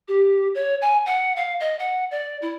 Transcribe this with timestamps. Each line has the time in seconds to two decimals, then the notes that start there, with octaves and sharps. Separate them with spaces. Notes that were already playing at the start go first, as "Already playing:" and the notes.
0.08 G4
0.55 C#5
0.82 G#5
1.06 F#5
1.36 F5
1.60 D#5
1.79 F#5
2.11 D5
2.42 E4